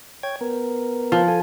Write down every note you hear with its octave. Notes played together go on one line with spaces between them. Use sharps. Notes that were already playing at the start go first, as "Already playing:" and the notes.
C#5 G5 G#6
B3 A#4
F3
F4 A4 G#5